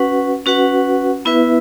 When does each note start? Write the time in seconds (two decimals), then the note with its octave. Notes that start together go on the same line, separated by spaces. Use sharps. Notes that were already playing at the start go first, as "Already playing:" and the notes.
Already playing: C#4 F#4 B4 F#5
0.46 C#4 F#4 B4 F#5
1.25 B3 E4 B4 E5